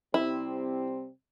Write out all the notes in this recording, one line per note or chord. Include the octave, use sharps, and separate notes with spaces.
C3 G3 C4 E4